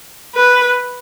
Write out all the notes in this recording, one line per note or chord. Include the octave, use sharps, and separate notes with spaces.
B4